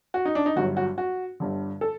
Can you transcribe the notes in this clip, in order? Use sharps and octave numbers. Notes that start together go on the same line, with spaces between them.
F#4
D#4
D4
D#4
G1 G2 F#3 F#4
F#4
F#4
G1 G2 D3
A4